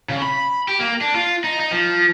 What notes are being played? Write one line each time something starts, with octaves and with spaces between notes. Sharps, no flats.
C#3
B5
G4
A#3
D4
F4
D#4
D#4
F3